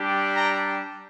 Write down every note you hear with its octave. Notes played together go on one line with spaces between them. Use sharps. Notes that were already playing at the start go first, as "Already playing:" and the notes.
Already playing: G3 D4 G4
G5 A#5